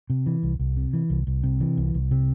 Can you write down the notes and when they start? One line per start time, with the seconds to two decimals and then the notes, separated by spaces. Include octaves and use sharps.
0.10 C3
0.26 E3
0.43 C2
0.59 C2
0.76 C3
0.93 E3
1.10 C2
1.27 C2
1.43 C3
1.60 E3
1.77 C2
1.94 C2
2.11 C3